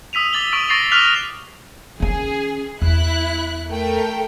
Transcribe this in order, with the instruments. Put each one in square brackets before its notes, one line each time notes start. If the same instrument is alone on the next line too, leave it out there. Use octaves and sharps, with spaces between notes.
[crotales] D#6 E6 B6 D#7 F7
D6 A6 F#7 G7
C#6 E6 D7
C#6 A6 A#6 C7 D7 F7
D6 F6 F#6 B6 F7 G7
[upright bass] D#3 C#4 [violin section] G#4
[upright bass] E2 [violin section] E4 F#6
[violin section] A3 A#4 G5